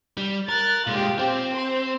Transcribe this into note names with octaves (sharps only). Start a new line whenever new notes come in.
G3
A#4 F#6 A6
A#2 G#3 F4 G4
C4 G4
C6